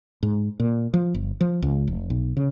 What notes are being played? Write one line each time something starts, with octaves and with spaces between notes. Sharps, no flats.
G#2
A#2
F3
G1
F3
C#2
F1
B1
C#3